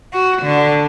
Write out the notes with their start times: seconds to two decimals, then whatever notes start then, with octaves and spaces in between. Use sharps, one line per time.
0.13 F#4
0.42 D3